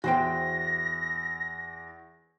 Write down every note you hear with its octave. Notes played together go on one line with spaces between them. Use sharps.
E2 F#4 C5 G5 A#6